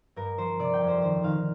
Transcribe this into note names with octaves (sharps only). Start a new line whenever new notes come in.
G2 A#4
F3 C5
C3 D5
G5
F2
C5
D#3 C5
D#3 F5